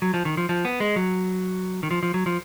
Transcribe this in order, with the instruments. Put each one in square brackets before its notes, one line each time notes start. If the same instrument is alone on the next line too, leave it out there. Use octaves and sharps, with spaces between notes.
[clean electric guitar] F#3
F3
D#3
F3
F3
B3
G#3
F#3
D#3
F3
F3
F#3
F3